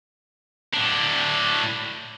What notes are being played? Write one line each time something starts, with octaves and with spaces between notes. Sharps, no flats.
A2 D4